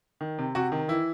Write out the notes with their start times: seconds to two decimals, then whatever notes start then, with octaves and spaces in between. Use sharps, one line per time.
0.21 D#3
0.38 C3
0.55 C3 F#4
0.72 D#3
0.88 E3 E4